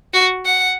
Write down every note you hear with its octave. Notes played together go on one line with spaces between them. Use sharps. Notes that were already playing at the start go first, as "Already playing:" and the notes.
F#4
F#5